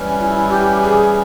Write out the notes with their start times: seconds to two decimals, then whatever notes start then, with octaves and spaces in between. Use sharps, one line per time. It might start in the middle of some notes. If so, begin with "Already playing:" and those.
Already playing: E3 G3 C#4
0.20 F4
0.24 E4
0.50 G4
0.82 G#4